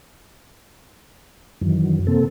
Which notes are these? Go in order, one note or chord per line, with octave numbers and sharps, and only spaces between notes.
F#2 D#3 E3 F#3
C3 A#3 C4 A4